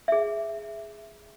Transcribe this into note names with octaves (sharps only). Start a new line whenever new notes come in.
G#4 E5